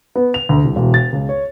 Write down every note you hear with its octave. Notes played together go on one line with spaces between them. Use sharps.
B3
F7
D2
C2
E1
A6
C#2
C#5